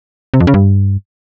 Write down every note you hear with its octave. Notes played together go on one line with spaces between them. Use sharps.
C3
F2
C#3
G2